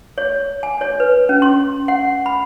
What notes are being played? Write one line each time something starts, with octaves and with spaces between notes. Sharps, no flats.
C#5
G#5
C#5
B4
C#4
C6
F#5
B5